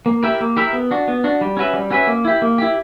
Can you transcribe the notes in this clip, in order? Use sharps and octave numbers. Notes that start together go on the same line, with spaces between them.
A#3
E4 G4 A#4 E5
A#3
E4 G4 A#4 E5
B3
D4 F#4
B3
D4 F#4
G3
C#4 F#4 B4 E5
G3
C#4 F#4 B4 E5
A#3
E4 G4
A#3
E4 G4